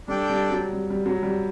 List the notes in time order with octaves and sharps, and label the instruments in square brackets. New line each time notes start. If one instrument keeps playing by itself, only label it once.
[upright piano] G3 [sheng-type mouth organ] D4 A4 D5 G5
[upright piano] G3
F#3
G3
G3
F#3
G3